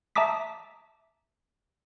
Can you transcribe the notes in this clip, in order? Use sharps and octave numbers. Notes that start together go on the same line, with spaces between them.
E5 A5 A#5 D6 D#6 B6